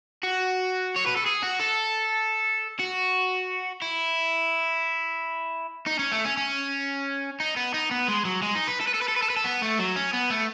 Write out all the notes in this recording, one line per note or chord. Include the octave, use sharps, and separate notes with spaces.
F#4
C#5
B4
A4
G#4
F#4
A4
F#4
E4
D#4
C#4
A3
C#4
C#4
D#4
B3
D#4
B3
G#3
F#3
G#3
D#4
B4
A4
B4
A4
B4
A4
B4
A4
B4
A4
B3
A3
F#3
C#4
B3
A3